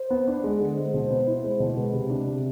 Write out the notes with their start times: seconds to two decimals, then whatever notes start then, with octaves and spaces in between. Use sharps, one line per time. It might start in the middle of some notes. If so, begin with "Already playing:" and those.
Already playing: C5
0.10 B3
0.28 D4
0.44 G#3
0.60 D3
0.77 G#3 C5
0.94 B2
1.11 B3
1.27 E4
1.44 G#3
1.60 B2
1.77 G#3 B4
1.93 C3
2.10 D4
2.27 C3